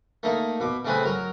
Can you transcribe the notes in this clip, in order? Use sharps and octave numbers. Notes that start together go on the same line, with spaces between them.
A3 A#3 D#4
B2 D6
C#3 G#3 A3 C4 G#4 B4
F#3 A#4